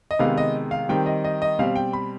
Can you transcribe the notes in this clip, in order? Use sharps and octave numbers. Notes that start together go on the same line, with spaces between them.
D#5
C3 D#3 G#3 B3 F5
D#5
F5
D#3 G3 C4 G5
D#5
D#5
D#5
B2 G3 C4 F5
G5
B5